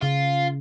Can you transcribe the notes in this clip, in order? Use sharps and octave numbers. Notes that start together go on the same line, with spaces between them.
C#3 F4